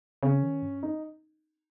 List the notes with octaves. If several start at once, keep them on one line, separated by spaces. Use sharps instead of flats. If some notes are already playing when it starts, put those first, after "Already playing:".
C#3 C#4
D#3
G2
D#4